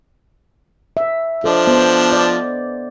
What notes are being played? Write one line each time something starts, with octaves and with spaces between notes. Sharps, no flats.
E5
F3 D4 A4 C5 D#5
B3 C5
D5